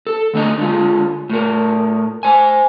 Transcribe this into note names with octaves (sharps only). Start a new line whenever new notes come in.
A4
D3 A3 D4 D#5 A#5
D3 G#3 F4
A2 A#4
C5 G#5